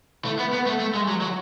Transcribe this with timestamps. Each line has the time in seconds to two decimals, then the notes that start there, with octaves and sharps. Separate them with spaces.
0.25 A3
0.39 B3
0.53 B3
0.66 A3
0.80 A3
0.94 G#3
1.08 F#3
1.21 F#3